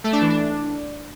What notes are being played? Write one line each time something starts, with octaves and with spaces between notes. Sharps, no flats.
A3
D4
E3
D4